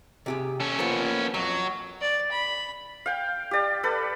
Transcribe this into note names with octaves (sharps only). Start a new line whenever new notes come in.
C3 G4 G#4
C#4 A4
F3 A#3 B3
F2 F#3
D5
B5
F5 G5
G4 D5
A4 B4